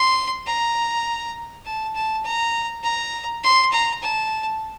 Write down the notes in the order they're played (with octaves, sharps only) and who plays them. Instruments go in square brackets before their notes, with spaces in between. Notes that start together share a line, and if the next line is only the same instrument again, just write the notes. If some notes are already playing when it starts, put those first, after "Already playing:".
Already playing: [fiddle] C6
A#5
A5
A5
A#5
A#5
C6
A#5
A5